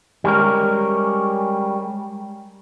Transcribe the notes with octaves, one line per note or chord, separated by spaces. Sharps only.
G3 G#3 C#4 A#4